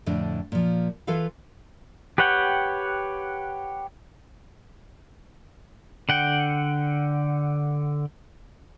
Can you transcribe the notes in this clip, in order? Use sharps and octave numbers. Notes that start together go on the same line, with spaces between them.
F2 A2 D3 D4
A#2 F3
E3 F4 A4 B4 F5
G4 B4 C#5 F#5 G5
D3 F#5 G5